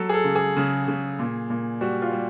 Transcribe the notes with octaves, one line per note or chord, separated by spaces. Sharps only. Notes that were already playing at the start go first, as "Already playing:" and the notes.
Already playing: F#3 A4
G#4
A4
C#3
G#4
C#3
C#3
A#2
A#2
G3 F#4
F4
G3